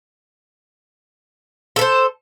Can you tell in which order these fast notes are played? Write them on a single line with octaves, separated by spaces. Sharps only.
A4 B4 C5